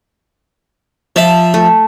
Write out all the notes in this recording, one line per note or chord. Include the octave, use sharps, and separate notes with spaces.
F3 E5 A5
A3